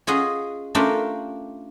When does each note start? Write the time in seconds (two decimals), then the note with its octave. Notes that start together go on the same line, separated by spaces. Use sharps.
0.07 C#4 F4 G#4 D#5 F#5
0.75 A3 C#4 D4 F4 G4 A#4